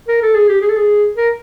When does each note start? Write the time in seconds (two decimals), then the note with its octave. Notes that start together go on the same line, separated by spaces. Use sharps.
0.08 A#4
0.22 A4
0.35 G#4
0.49 G4
0.62 G#4
0.70 A4
0.77 G#4
1.17 A#4